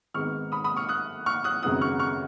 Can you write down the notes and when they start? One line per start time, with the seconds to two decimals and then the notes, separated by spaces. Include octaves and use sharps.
0.14 G#1 G#2 D#3 G#3 B3 C#6 F6
0.52 B5 D#6
0.64 B5 D#6
0.76 C#6 F6
0.89 D#6 F#6
1.26 C#6 F6
1.44 D#6 F#6
1.63 G#1 F#2 C#3 G#3 B3 D#6 F#6
1.81 C#6 F6
1.99 C#6 F6